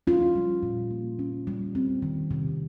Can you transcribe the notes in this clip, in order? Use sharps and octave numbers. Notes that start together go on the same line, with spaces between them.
C#4 F4
G3
A#2
A#3
C#4
G3
C4
D#3
C3